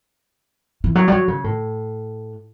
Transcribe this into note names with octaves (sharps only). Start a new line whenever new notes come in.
E3
F#3
G3
F#3
C#3
A2